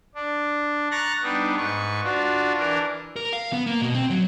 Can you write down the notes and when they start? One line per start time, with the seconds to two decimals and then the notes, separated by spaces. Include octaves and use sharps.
0.15 D4
0.91 A#5 C#6 F#6 A6 A#6
1.23 G3 B3 D4 D#4
1.57 G#2 B4 C#6
2.03 D4 F4 F#4
2.57 E3 D4 A#4
3.16 A#4
3.33 F5
3.53 B3
3.66 A#3
3.81 B2
3.95 C4
4.10 F#3